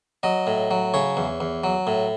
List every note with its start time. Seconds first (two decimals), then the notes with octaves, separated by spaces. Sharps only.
0.23 F#3 D#5
0.47 A2
0.71 F#3
0.94 C#3 C#5
1.17 E2
1.40 E2
1.64 F#3
1.87 A2